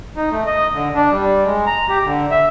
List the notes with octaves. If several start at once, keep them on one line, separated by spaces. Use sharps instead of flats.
D#4
A3
D#5
D3
D4
G3
G#3
A#5
G4
D3
E5